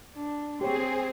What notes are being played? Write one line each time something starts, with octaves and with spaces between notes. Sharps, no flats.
D4
C4 G4 G#4 C5 C#5 G5